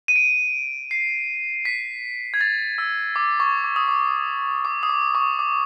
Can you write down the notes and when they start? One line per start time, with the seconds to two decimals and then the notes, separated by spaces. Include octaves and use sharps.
0.08 D#7
0.16 D7
0.91 C7
1.65 B6
2.34 G#6
2.41 A6
2.78 E6
3.16 D6
3.40 C#6
3.64 D6
3.76 D#6
3.88 D6
4.65 D6
4.83 D#6
4.89 D6
5.15 C#6
5.39 D6